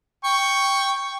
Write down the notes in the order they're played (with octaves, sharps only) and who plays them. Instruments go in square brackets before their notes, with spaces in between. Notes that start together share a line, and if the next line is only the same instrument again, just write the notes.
[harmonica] G5 C#6